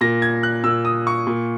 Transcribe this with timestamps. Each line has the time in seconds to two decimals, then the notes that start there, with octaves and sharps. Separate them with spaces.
0.01 A#2 A#6
0.22 G#6
0.43 F#6
0.64 A#2 E6
0.85 D#6
1.07 C#6
1.27 A#2